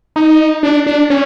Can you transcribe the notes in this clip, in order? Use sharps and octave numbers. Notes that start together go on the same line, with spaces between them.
D#4
D4
D4
C#4